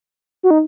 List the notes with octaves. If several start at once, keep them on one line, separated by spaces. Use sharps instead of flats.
F#4
D#4